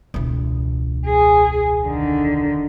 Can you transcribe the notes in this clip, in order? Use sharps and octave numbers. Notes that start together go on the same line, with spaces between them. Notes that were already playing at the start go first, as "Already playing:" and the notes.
E1 C#2
G#4
D3 D#3